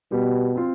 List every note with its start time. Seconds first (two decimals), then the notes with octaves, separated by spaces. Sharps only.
0.12 B2 G3
0.55 C4 F4